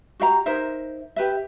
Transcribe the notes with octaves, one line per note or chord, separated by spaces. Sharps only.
F#4 G4 E5 A#5
D#4 A#4 C5 E5
G4 B4 E5